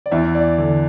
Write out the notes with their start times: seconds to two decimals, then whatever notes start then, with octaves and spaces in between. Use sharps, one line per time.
0.06 D5
0.11 E2 E5
0.35 D5
0.58 D3